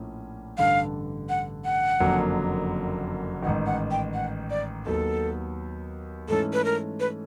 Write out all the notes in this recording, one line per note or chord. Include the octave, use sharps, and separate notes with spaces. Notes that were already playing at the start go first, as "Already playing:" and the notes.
Already playing: A#1 A2 F3 A#3 C#4
A1 G2 D3 F5
F#5
F#5
F#1 F2 D3 F#3 A#3
A1 G#2 D#3 F#5
F#5
G5
F#5
D5
D#2 D#3 F#3 B3 A4
G#2 E3 A3 C#4 A4
B4
A#4
B4